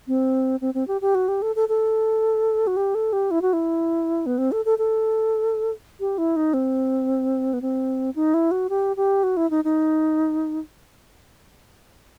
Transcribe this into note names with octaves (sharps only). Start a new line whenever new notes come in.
C4
C4
C4
G4
G4
F#4
G4
A4
A4
A4
F#4
G4
A4
G4
E4
F#4
E4
B3
C4
A4
A4
A4
G4
E4
D#4
C4
B3
C4
D#4
E4
F#4
G4
G4
F#4
E4
D#4
D#4